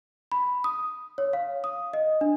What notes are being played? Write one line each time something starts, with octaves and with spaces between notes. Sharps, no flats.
B5
D#6
C#5
F5
D#6
D#5
D4